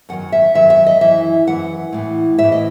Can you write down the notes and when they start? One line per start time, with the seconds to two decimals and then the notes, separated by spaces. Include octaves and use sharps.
0.09 F#2 D#3 F#3 F#5
0.32 E5
0.55 F#2 D#3 F#3 E5
0.70 E5
0.86 D#5
1.01 F#2 E3 E5
1.47 F#2 E3 F#5
1.92 A2 E3
2.38 A2 E5
2.44 E3
2.52 D#5